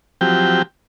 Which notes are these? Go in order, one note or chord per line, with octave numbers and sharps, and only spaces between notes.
F3 F#3 C4 G4 G5